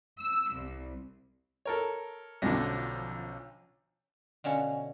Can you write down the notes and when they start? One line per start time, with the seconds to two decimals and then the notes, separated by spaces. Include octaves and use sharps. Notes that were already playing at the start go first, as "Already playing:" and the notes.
0.20 E6
0.53 C2
1.65 A4 A#4 C#5
2.42 B1 D3 F3 C#4 A#6
4.44 B2 D3 C#4 F5 G#5